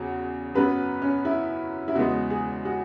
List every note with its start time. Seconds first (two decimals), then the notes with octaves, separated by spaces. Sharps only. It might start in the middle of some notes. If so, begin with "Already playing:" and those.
Already playing: E2 C#3 F#4
0.54 F#2 F#3 B3 B4
1.02 C#4
1.25 E4
1.88 E4
1.95 E2 C#3 G#3 B3 F#4
2.30 G#4
2.65 F#4